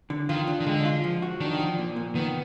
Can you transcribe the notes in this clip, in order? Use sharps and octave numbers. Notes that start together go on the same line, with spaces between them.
D3
D#3 F4
D4
D#3
D3 G#3
F4
F3
F#4
D#3 D4
F3
A#2
A#2
D#3 B3